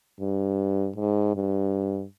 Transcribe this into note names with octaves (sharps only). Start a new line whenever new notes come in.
G2
G#2
G2